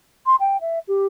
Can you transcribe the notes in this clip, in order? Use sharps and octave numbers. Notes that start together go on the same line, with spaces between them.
C6
G5
E5
G4